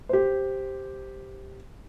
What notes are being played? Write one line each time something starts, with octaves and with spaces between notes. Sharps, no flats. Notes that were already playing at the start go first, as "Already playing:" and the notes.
G4 C5